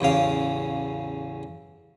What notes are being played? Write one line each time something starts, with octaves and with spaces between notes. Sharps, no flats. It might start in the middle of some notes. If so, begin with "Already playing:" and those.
A1 E2 C#3 F5